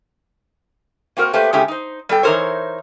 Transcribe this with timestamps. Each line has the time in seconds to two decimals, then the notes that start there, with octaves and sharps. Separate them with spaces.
1.17 A#3 C4 F#4 A#4
1.33 A3 A#3 G4 B4 C5
1.53 C#3 G#3 A3 C#4 E4 G4
1.68 D#4 C5
2.09 G3 B3 A4 G5
2.23 E3 D#4 A4 A#4 C5 C#5